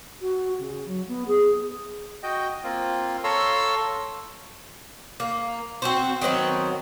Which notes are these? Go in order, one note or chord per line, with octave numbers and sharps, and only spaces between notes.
F#4
C#3
F#3
B3
G#4
F#4 D#5 G5
A#3 C4 F4
A4 C#5 F5 A#5 C6 E6
A#3
C4 F#4 C5
D#3 F#3 B3 C4